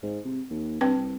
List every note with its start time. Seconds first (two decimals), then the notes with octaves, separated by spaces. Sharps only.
0.03 G#2
0.25 C3
0.50 D#2
0.81 G2 C4 B4 G5
0.96 C2